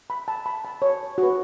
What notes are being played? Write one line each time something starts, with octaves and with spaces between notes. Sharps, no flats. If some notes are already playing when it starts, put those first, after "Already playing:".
B5
A5
B5
A5
C#5
F#4
B4